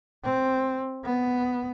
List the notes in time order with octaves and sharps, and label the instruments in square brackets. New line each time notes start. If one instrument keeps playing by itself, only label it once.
[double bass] C4
B3